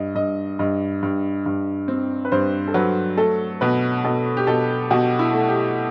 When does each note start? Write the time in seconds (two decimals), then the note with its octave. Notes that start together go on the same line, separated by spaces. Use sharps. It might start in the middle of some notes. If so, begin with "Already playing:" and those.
Already playing: G2 D#5
0.15 G2 D#5
0.59 G2 D#5
1.03 G2
1.46 G2
1.88 C4
2.25 B4
2.32 G2 C5
2.68 A4
2.74 F#3 B4
3.17 A3 A4
3.61 B2 B4
4.04 B2 A4
4.37 G4
4.47 B2 A4
4.91 B2 F#4
5.19 E4
5.33 A3
5.49 G4